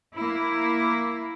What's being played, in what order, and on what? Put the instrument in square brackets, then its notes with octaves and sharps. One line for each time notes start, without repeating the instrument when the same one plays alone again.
[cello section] A#3 E4